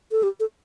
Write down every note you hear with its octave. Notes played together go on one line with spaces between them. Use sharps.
A4
G4
A4